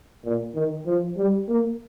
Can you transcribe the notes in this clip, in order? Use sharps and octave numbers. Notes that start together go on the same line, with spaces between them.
A#2
D#3
F3
G3
A#3